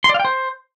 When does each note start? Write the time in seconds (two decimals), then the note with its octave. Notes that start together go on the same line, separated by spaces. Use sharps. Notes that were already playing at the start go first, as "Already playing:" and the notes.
0.04 C6
0.09 D5
0.14 F5
0.20 G5
0.25 C5